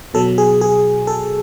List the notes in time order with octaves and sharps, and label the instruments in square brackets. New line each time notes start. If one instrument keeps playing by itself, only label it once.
[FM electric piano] B2 F#3 A4
G#4
G#4
A4